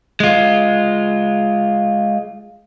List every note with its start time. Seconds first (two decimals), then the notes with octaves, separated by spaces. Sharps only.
0.20 G#3 F4